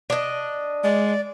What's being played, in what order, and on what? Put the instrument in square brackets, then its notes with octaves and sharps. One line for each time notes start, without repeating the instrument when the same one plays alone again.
[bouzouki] D4 D#5
[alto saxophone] G#3 [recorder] D5